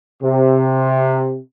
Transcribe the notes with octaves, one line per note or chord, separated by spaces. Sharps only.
C3